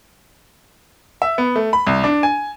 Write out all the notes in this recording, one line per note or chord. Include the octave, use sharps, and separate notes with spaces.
E5
B3
A3
B5
C2
D4
G#5